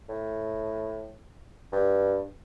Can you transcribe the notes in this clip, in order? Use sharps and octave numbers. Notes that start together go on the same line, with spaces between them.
A2
G2